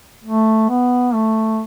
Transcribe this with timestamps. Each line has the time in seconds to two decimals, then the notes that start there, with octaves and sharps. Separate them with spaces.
0.24 A3
0.69 B3
1.14 A3